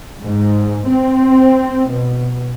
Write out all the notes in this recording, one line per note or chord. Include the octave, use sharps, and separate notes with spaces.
G#2
C4
B2